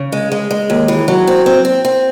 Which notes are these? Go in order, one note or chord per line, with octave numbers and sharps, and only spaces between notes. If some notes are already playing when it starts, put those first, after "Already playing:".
Already playing: C#3
G#3
G#3
G#3
D#2
E3
F#3
C4
C4
C4
C4